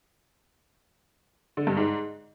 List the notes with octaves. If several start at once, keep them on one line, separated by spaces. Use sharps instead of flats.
D3
G2
G#2